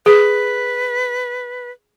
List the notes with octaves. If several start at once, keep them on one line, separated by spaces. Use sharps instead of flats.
G#4 B4